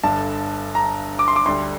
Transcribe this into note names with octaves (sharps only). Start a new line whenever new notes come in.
G1 G2 D3 A5
A#5
D6
C6
D6
D2 D3 G3 C6